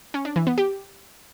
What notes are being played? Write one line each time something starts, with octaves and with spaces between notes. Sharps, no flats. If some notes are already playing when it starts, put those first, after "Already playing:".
C#4
D4
E3
B3
G4